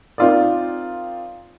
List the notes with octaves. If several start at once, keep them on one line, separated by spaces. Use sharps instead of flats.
C4 D#4 F4 A#4 D5